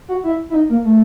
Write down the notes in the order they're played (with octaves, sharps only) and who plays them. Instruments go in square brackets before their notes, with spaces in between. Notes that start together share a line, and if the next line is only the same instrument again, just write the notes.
[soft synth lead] F#4
E4
E4
D#4
A#3
A3